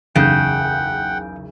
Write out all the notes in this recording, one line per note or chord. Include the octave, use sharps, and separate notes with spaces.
F#1 B1 E2 C#3 F#5 G5 G6 D7